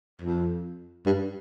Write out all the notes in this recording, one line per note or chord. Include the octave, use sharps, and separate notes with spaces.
F2
G2